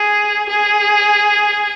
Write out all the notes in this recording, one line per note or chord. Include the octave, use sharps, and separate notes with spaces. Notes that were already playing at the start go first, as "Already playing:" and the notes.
Already playing: G#4
G#4